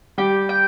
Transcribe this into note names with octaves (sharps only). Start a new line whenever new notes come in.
G3 G4
G5